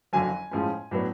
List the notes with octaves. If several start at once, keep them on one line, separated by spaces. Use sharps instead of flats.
F#1 F2 D3 F#3 G#5
A2 F3 G#3 C#4
A2 F#3 B3 D4